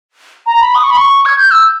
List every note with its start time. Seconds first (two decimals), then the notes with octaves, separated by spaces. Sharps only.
0.46 A#5
0.61 B5
0.75 D#6
0.84 C#6
0.90 B5
0.97 C#6
1.26 G#6
1.38 G6
1.51 E6